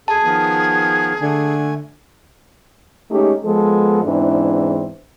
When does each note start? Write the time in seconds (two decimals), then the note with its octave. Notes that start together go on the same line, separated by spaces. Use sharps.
0.08 F#2 G#4 A4 A5
0.23 D#3 F3 B3
1.22 D3 A3 G#5
3.11 G#3 A3 C#4 D#4 G4
3.44 F3 G#3 B3 A4
4.05 E2 G#2 E3 C4 D4